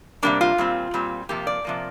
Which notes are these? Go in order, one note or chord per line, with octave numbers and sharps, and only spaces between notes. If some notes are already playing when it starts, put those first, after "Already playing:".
C3 G3 A#3 D4
F4
A#2 G3 C4
A#2 G3 C4
C3 F3 A#3 G4
D5
C3 F3 A#3